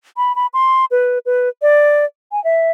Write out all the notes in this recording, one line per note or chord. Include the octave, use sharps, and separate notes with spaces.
B5
B5
C6
B4
B4
D5
G#5
E5